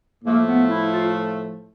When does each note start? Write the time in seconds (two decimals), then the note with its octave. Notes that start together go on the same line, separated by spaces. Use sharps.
0.24 A2 F3 A3 A#3
0.46 B3
0.69 E4
0.93 F4